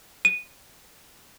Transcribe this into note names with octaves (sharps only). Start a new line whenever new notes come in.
D#7